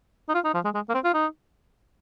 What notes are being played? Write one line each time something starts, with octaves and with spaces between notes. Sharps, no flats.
D#4
F4
D#4
F3
G#3
G#3
A#3
C4
F4
D#4